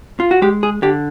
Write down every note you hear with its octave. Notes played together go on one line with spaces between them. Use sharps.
F4
F#4
G#3 G4
G#4
D3 G4